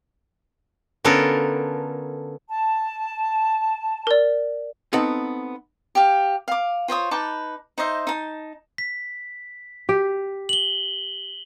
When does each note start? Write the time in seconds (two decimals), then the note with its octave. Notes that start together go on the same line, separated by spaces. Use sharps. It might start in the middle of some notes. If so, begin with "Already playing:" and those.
1.04 D3 B3 C#4 F4 A4 A#4
2.48 A5
4.07 A#4 D5
4.93 B3 C4 D#4 A4 F#5
5.95 G4 F5
6.48 F5 D6
6.88 F4 C5 C#5 D#6
7.11 D#4 B4 A5 D6
7.78 D#4 C5 D#5 E5
8.07 D#4 A5
8.78 B6
9.89 G4
10.49 F#7 G7